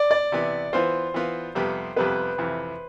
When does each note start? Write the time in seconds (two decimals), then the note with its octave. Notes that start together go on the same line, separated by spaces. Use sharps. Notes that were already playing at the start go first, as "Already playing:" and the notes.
Already playing: D5
0.11 D5
0.32 C3 E3 B3
0.73 E3 B3 F4 C5
1.14 E3 B3 F4
1.55 F2 C3 G3 B3
1.96 F2 C3 G3 B3 B4
2.38 F2 C3 E3